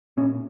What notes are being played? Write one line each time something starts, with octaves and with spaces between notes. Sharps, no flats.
A#2 C#4